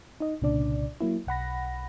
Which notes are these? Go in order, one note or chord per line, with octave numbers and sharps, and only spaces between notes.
D#4 D#5
C2 A#2 C#3 D4 D5
F#3 A#3 E4
B1 F#5 B5 A#6